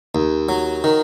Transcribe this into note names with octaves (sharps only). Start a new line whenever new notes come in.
D#2
F#3
D#3